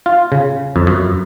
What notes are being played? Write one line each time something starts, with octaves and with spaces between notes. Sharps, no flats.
F4
C#3
F2
F#2